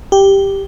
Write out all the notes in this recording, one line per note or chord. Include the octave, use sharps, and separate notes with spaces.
G4